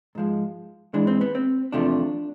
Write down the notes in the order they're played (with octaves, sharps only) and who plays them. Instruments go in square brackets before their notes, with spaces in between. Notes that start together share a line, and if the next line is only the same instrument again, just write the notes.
[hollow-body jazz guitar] G#2 F3 G#3
G#2 E3 G#3 D4
C4
B3
C4
E2 C3 F3 A3 D4